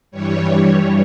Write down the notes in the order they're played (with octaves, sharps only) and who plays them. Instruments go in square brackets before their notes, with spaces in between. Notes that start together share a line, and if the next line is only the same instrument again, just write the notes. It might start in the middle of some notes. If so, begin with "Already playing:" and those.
[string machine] G2 E3 G3 C#5